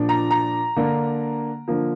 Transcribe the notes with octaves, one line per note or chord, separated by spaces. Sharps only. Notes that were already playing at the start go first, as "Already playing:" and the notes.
Already playing: A#2 F3 D4
A#5
A#5
D3 A#3 D4
D3 F3 A#3